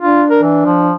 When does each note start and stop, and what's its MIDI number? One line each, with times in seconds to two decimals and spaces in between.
0.02 0.95 62
0.02 0.23 65
0.30 0.41 70
0.43 0.64 52
0.65 0.93 53